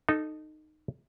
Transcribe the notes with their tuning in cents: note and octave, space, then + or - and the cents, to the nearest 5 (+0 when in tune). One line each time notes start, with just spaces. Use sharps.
D#4 -15 A4 +0